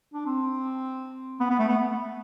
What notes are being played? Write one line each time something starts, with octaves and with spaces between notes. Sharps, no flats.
D4
C4
B3
B3
A3
B3